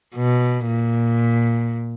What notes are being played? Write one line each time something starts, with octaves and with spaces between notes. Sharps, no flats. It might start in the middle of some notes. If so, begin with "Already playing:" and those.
B2
A#2